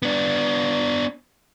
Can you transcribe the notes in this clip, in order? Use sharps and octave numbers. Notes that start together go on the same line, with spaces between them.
B3 D4